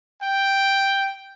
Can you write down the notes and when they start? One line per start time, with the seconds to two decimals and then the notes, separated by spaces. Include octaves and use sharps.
0.22 G5